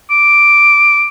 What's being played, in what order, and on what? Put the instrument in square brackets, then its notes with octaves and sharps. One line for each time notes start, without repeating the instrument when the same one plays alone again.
[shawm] D6